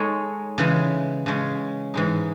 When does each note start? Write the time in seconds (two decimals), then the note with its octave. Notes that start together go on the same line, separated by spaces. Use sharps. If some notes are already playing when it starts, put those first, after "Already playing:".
Already playing: G#3 D#4 A4 C#5
0.58 C#3 E3 G#3
1.26 C#3 G#3 C#4
1.94 G#2 E3 G#3 D#4